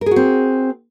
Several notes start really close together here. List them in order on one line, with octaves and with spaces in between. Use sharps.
A#4 G#4 F#4 C4